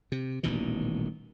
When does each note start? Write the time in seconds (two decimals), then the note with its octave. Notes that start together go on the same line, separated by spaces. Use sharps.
0.12 C3
0.43 D#1 A1 B2 D#3